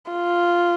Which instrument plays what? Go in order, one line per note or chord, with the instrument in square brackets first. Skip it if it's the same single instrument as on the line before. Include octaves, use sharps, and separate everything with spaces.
[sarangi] F4